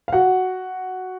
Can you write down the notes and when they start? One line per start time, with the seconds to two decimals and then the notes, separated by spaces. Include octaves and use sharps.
0.08 F5
0.13 F#4 F#5